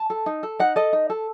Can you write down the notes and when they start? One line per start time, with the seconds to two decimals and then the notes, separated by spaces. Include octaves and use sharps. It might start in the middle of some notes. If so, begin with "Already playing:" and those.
Already playing: A5
0.10 A4
0.26 D#4
0.43 A4
0.59 D#4 F#5
0.76 A4 D#5
0.93 D#4
1.10 A4